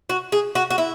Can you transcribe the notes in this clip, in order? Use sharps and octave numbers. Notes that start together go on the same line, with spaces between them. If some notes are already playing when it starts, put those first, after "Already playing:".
F#4
G#4
F#4
F#4
E4